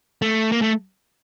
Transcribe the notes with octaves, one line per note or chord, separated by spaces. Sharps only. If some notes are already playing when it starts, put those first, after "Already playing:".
A3
A#3
A3